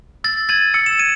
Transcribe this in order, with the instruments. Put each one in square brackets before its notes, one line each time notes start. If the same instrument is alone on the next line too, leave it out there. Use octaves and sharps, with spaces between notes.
[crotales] E6 [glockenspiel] A6
[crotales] G#6 D#7 F#7 [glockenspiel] A6
[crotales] E6 [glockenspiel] C#7
[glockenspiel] E7
[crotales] G#6 [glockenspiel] D#7